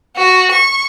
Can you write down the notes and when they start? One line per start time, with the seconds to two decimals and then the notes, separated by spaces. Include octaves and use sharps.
0.16 F#4
0.51 C#6